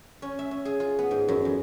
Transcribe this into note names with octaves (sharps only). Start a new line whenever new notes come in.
C#4
E5
C#4
G#4
F4
B3
G#2
F#2
F2